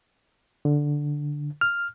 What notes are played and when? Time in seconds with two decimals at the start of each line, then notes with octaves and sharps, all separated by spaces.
0.65 D3
1.61 F6